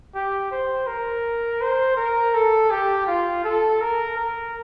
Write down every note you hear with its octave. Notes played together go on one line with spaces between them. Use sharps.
G4
C5
A#4
C5
A#4
A4
G4
F4
A4
A#4
A#4